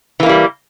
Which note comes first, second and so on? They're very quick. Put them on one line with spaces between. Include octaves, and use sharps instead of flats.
E3 A#3 E4 G3